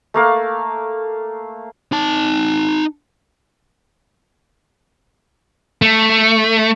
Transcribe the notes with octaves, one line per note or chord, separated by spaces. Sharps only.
A3 A#3 F5
D#4 A5
A3